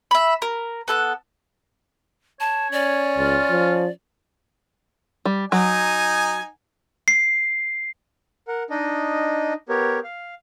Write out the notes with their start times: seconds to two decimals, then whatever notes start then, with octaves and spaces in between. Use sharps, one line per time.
0.11 E5 B5
0.42 A#4
0.88 B3 A4 F#6
2.40 C#5 A5
2.72 C#4 D5
3.17 C#2 F4
3.50 F3
5.25 G3
5.52 F#3 D#4 G#5
7.08 C7
8.48 A#4 F#5
8.70 D4 D#4 D#5
9.69 B3 G4 A#4 C#5
10.04 F5